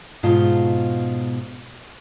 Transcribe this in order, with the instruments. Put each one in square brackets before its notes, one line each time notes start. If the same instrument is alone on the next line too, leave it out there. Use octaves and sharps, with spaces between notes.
[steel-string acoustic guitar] G#2 B2 F4 F5 A5